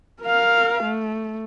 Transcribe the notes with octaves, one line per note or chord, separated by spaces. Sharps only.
A#4 F5
A3